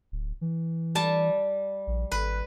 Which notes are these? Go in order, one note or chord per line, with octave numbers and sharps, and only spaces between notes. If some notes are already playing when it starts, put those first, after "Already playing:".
D1
E3
G3 A5
A#1
G#1 B4